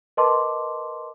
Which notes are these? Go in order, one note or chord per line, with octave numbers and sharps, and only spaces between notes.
A#4 B4 D#5 A5 C6 D6